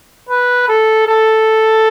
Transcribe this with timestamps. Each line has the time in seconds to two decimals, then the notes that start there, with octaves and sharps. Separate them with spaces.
0.29 B4
0.69 A4
1.08 A4